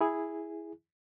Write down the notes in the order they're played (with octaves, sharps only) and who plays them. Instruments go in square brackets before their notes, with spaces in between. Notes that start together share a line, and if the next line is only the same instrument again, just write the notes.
[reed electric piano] E4 G#4